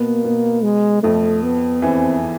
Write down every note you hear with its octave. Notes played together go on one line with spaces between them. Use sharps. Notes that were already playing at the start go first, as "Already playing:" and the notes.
Already playing: B2 A#3 B3
B2 B3
G#3
F2 F3 A3
B3
E2 E3 C4